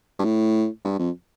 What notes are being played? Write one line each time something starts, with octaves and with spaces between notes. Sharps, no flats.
G2
A2
G2
F2